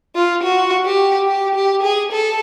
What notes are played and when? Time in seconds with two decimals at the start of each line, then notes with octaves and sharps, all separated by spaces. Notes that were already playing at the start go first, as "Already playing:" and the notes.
0.16 F4
0.44 F#4
0.86 G4
1.28 G4
1.55 G4
1.83 G#4
2.12 A4